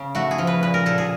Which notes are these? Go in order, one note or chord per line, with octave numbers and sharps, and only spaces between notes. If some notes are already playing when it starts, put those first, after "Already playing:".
Already playing: C#3
A3 F#4
G#4
F3
B4
A#2 B4
A#4
A#2 A4
G#4